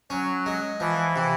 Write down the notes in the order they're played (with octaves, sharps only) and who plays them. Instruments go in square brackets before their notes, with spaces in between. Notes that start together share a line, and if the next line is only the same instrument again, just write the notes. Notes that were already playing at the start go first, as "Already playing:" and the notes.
[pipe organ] F#3 [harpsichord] C#4
[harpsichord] G#3
[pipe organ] E3 [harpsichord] F3
[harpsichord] C3